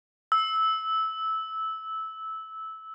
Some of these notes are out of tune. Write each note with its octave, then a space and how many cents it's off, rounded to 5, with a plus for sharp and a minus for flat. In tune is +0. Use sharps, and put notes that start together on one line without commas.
E6 -15